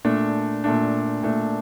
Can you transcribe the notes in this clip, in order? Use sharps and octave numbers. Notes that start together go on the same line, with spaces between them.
A#2 A3 D4
A#2 A3 D4
A#2 A3 D4